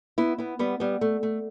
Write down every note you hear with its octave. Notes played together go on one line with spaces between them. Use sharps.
B3 E4
B3 E4
G3 B3
G3 B3
A3
A3